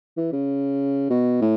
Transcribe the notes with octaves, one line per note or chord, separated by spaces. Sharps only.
E3
C#3
B2
A2